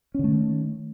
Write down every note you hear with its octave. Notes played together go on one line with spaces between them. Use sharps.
D3 D#3 A3 C#4